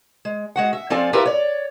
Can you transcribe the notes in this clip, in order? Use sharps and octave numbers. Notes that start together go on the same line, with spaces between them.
G#3
G#3 F#4 F#5
E5
F3 C4 F4 A4 D5 G#5
E4 F4 G4 A#4 B4 E5
C#5 D5